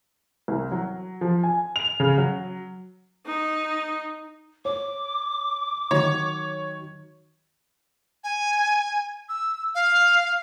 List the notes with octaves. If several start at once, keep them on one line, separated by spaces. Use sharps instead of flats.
C2
F#3
F3
G#5
F7
C#3
F#3
D#4
C#5 D6
D#3 F#3 C#5
G#5
E6
F5